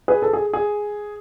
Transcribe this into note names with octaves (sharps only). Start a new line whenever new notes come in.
G#4 B4
A4
G#4
G#4